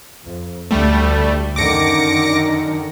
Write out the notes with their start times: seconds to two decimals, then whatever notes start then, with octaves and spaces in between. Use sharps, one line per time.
0.23 F2
0.71 D2 D3 G3 A3
1.56 F#2 D3 D#3 D6 A#6 C#7